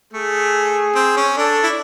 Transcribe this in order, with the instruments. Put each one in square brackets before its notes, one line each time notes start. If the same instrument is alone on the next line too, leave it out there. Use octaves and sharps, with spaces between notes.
[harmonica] A3 [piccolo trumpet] G#4
[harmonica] C4
C#4
[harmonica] D4 [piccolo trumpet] A4
[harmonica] E4